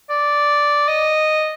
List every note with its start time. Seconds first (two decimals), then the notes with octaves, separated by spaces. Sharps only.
0.10 D5
0.88 D#5